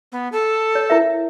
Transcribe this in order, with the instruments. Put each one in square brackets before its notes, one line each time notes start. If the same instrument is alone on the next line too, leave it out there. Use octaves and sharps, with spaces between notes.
[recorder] B3
A4
[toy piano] C#5
E4 A#4 E5